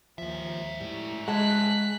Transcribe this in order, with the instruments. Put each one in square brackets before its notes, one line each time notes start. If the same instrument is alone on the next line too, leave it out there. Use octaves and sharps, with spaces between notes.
[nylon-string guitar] D#2 F3 [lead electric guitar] G#2 E5
[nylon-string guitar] A2 G3
[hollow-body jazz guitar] G#3 [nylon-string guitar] F#5 A5 [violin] F#6 B6